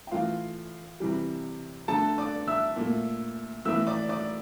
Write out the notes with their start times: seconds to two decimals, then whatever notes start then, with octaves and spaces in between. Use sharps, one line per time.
0.07 G5
0.11 A2 E3 A3 F4 F5
1.00 C3 E3 G3
1.88 D3 A3 A4 A5
2.18 D5 D6
2.47 E5 E6
2.76 A#2 A3
3.65 A2 E3 A3 E5 E6
3.87 D5 D6
4.09 D5 D6